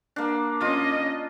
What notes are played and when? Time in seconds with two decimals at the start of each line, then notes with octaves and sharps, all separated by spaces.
0.16 A#3 D4
0.61 C#4 F4 D#5